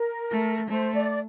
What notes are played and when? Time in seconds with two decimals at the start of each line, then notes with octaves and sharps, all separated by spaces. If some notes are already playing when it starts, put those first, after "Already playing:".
Already playing: A#4
0.31 A3
0.69 A3 C5
0.94 D5